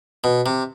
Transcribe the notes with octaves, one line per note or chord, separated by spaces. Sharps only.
B2
C3